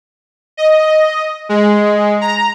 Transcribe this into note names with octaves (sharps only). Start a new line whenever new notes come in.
D#5
G#3
A#5